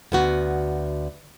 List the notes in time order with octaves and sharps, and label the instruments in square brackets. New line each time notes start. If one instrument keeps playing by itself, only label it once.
[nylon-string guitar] D2 B3 F#4